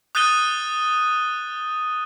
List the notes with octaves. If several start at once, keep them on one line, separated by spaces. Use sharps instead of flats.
D#6 F#6 G6 A6 D#7 G7